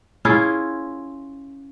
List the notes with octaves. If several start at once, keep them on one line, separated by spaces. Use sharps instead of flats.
C#4 E4 F4 G#4